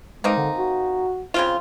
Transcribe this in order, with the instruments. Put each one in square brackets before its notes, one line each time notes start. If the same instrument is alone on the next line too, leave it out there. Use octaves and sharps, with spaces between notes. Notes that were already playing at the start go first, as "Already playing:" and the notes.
[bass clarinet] G#3 [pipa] A#3 C4 D#4
[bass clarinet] D3
F#4
[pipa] C#3 C4 F4